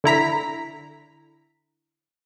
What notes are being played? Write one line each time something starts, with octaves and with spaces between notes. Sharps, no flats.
D3 E4 A#5 B6